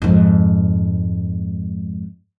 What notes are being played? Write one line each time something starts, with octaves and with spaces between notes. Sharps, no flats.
F2 G#2